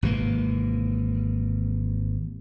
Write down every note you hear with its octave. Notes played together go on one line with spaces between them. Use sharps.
G#1 C3 E3 A#3